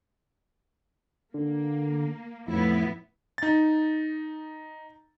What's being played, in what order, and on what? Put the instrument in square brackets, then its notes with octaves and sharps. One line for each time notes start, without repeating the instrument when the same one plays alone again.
[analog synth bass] D3 [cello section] A#3
[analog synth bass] F2 [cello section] A2 B3 E4
[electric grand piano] D#4 A6